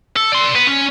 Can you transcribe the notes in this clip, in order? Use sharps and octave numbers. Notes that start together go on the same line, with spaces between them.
A4
D5 C6
B3
C#4